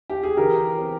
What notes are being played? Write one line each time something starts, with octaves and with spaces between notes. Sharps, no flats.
G4
G#4
E3 G4 A#4
C4